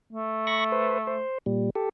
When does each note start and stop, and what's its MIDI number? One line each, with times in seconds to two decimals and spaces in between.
0.13 1.22 57
0.47 0.64 83
0.47 0.64 85
0.47 0.64 94
0.72 0.98 71
0.72 0.98 72
1.07 1.38 72
1.46 1.70 46
1.46 1.70 55
1.75 1.89 67
1.75 1.89 69